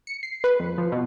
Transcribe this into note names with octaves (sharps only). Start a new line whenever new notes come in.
C#7
C7
B4
F2
F3
B2